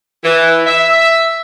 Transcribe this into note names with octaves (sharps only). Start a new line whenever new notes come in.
E3
E5